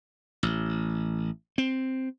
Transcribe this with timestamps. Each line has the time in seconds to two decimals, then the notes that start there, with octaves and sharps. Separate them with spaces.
0.43 A1
1.58 C4